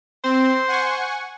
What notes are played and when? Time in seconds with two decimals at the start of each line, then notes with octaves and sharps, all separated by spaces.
0.24 C4 C5
0.68 F#5 G#5 C#6